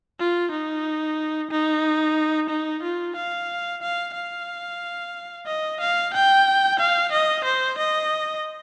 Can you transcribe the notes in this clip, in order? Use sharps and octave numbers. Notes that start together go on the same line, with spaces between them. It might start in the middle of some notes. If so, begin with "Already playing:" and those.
F4
D#4
D#4
D#4
F4
F5
F5
F5
D#5
F5
G5
F5
D#5
C5
D#5